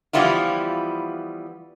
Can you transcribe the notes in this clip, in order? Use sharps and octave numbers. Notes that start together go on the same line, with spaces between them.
E3 F3 G3 B3 E4 F4